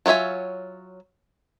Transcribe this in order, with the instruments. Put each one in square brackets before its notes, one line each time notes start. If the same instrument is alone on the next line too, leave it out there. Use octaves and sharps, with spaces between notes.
[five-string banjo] F#3 F4 C#5 E5 G#5